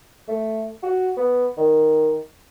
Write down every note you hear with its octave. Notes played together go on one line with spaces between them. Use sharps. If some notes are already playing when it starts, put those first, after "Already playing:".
A3
F#4
B3
D#3